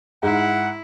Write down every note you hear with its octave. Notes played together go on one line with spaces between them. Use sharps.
G#2 E4 F#5